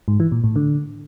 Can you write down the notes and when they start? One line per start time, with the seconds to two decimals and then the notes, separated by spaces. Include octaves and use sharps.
0.08 G#2
0.20 E3
0.32 A#2
0.44 A2
0.56 D3